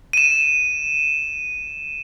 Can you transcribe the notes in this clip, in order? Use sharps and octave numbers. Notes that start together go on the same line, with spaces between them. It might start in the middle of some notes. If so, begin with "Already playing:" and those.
D#7 E7